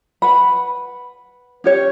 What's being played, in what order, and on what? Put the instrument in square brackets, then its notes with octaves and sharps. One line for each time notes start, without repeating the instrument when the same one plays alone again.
[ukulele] B4 F#5 B5
C#4 G4 C#5